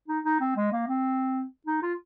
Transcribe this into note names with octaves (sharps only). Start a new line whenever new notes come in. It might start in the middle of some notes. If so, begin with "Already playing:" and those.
D#4
D#4
C4
G#3
A#3
C4
D#4
F4